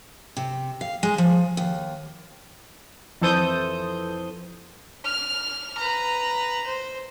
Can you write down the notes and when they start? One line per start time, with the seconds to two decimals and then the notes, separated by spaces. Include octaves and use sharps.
0.37 C3
0.81 F5
1.03 G#3
1.18 F3
1.57 D#2
3.21 F2 E3 A4 C5 D#6 G6
5.05 F6
5.77 B4 A#5
6.66 C5